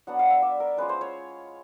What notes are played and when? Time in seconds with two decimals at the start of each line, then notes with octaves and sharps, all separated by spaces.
0.07 F#3 B3 D4 F#5
0.19 F5
0.30 E5
0.42 D5
0.60 A#4
0.77 G#3 C#4 F4 B4
0.89 C5
1.01 C#5